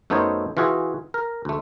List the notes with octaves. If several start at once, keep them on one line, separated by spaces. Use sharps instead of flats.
F#2 A3 B3 D#4 C5 C#5
E3 F4 F#4 G#4 E5
A#4
D2 A3